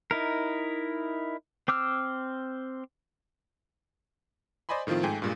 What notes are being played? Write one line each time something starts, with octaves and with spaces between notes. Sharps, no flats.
D#4 E4 A#4
C4 D6 E6 F6
C5 D5 D#5 G#5 B5 C6
A2 D#3 F3 C4 F4
G#2 A3 G5 G#5
G2 A#2 G#3